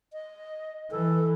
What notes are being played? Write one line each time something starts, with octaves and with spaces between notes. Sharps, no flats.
D#5
E3 A4